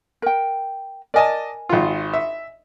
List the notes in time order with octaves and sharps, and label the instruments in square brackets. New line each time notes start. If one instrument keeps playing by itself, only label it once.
[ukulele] A#4 G5
[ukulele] A#4 G#5 [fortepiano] D5 D#5 A5
[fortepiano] G#1 F4
E5